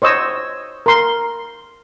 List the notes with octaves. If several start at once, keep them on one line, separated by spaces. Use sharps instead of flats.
C5 C#5 D#5 E6
A#4 C6